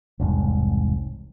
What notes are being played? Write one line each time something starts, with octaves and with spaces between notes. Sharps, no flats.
E1 C2 G#2